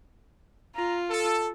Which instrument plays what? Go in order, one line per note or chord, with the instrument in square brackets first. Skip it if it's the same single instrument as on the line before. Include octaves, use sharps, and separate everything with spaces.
[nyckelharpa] F4 [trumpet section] A#5
[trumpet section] A4